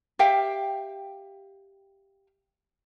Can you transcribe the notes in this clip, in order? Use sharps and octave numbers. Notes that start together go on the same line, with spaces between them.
G4 E5 F5 G5